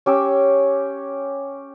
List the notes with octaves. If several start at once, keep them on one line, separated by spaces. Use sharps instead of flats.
C#4 G4 D6 E6